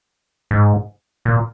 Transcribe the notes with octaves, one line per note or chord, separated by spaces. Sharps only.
G#2
A#2